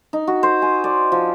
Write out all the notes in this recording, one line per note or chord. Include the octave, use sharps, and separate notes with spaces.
D#4
F#4
C5
G#5
D5
F3